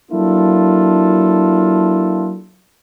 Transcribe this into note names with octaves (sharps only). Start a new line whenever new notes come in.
F#3 A#3 D4 E4 F4 A4